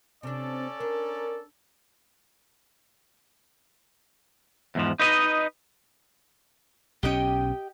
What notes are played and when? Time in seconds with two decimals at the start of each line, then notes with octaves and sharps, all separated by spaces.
0.23 C3 C#4 D4 A4 D5
0.80 D4 A#4
4.75 E2 G#2 F3
4.99 D#4 B4 D#5
7.03 B1 C#4 G4 D#5 G5